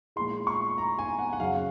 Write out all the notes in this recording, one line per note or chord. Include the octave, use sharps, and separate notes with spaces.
A#2 F3 G#3 C6
C#6
A#5
G#5
F#5
F#5
F#2 C#3 F#3 F5